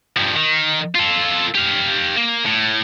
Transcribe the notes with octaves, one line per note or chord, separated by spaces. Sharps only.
G2 F3
D#3
F4 A4
G4 F5
A#3
A2